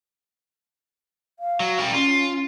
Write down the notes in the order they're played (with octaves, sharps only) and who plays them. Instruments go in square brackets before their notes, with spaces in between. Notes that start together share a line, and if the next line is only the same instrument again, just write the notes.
[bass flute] F5
[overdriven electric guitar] F#3
G3 A#4
[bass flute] C#4 [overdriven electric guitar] F4